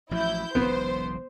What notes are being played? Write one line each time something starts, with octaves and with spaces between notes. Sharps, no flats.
A1 F3 F#3 E4 G6
E1 B1 C#3 B3 C5